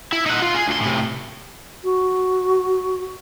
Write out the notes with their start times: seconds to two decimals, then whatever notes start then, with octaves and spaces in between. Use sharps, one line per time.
0.13 E4
0.26 D#4 F#5
0.42 F4
0.54 G#4
0.68 D2 C6
0.81 A2 C3
1.84 F#4